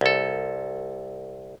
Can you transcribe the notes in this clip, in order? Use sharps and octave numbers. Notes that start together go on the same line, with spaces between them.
C2 A4